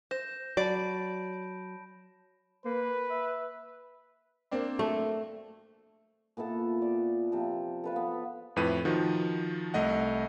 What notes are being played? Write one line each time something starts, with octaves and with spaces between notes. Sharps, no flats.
C5 G6 A#6 E7
F#3 D5 A5 B5 D7
A#3 B4
E5
A#3 C4 D4
A3
A#2 B3 E4 A4
D5
C3 F3
A4 B4 F5
B3
F2 A2 E4 B4 D#7
D#3 F3 F#4
C2 A3 D#5 F#5